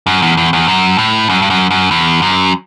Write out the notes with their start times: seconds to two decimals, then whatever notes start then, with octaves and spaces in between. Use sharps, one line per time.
0.07 F#2
0.22 E2
0.37 E2
0.53 E2
0.68 F#2
0.98 A2
1.29 F#2
1.42 G2
1.50 F#2
1.71 F#2
1.91 E2
2.22 F#2